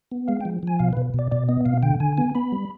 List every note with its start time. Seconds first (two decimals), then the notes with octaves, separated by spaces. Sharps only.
0.12 B3
0.28 G#3 F5
0.41 G5
0.45 F3
0.63 F3 G#5
0.79 B2 F5
0.93 B4
0.97 B2
1.14 B2 D5
1.31 B2 D5
1.49 B3 D#5
1.65 B2 F5
1.83 D3 G5
2.00 D3 G#5
2.18 B3 G#5
2.35 B3 B5
2.52 G3